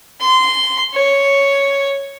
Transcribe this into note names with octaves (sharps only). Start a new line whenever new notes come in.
C6
C#5